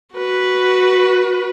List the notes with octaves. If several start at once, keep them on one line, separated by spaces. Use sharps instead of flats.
F#4 B4